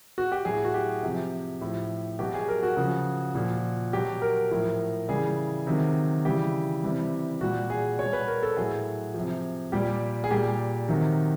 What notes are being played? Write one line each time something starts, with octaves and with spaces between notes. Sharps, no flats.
F#4
G4
A2 F#3 G#4
F#4
G4
C3 F3
A2 F3
B2 F#3 G4
G#4
A#4
F#4
C#3 F3
A#2 F3
B2 F#3 G4
A#4
A2 F3
C#3 E3 G3 G#4
C3 D#3 F#3
C#3 E3 G3 G4
C3 E3 G3
A#2 G3 F#4
G#4
B2 G3 C#5
B4
A#4
A4
A2 F#3 G#4
F3
C3
A#2 G3 G4
G#4
A#2 G3 G4
C3 D#3 F#3